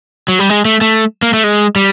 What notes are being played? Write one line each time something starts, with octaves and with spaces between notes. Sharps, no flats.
F#3
G3
G#3
A3
A3
A#3
A3
G#3
G3